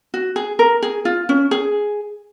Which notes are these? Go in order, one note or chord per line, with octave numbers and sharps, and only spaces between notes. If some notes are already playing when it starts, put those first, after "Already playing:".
F#4
G#4
A#4
G#4
F4
C#4
G#4